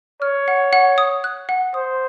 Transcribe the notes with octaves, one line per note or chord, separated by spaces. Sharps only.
C#5 F6
F#5
F#5
D#6
F#6
F#5
C5 D#6